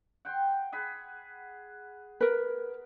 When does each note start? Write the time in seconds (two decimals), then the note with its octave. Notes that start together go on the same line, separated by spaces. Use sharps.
0.25 F#5 G5 C6
0.72 G#4 F#5 B5
2.21 A#4 B4